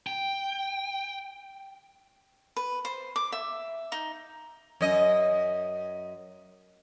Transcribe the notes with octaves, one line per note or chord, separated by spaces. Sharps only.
G5
B4
C5
D6
E5
D#4
F#2 D#5